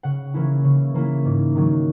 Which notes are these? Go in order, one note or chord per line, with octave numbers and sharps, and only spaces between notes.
C#3 F#5
E3 A#3 C#4 E4
C#3
E3 A#3 C#4 E4
G#2
D#3 F#3